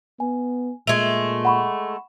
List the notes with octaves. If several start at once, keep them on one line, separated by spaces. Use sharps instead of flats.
B3 G#5
A#2 G#3 A3 F7
F#5 B5 C#6